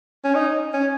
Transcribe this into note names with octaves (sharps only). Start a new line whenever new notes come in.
C#4
D#4
C#4